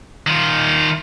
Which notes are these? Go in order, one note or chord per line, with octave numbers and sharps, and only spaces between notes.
D#3 F4